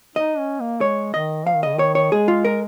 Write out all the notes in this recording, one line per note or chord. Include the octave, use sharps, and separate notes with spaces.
D#4 D#5
C#4
A#3
G#3 C#5
D#3 D#5
F3 F5
D#3
C#3 D#5
D#3 C#5
C#5
G#3 G#4
F4
A#4